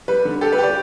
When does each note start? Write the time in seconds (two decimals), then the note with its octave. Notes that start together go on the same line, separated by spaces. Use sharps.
0.08 G3 B4
0.25 D3
0.41 G4 A4
0.52 B4
0.58 G4 D5